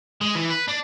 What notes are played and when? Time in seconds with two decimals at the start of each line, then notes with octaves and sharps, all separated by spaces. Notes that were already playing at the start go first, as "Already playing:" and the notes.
0.21 G#3
0.35 E3
0.50 B4
0.68 D4